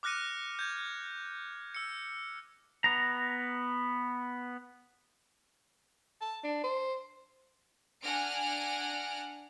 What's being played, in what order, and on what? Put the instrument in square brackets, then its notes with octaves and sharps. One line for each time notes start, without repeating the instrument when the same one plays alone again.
[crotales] D6 F6 F#6 A#6 C#7 D#7
G6 G#6
E6 C#7
[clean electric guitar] B3 A#5
[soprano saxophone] A5
D4
C5
[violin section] D4 F#5 G#5 F6 A#6 D7